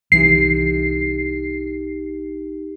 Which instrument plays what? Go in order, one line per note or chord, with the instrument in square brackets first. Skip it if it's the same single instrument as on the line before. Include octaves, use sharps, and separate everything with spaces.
[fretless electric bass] C2 E3 [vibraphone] D#4 G4 [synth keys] C7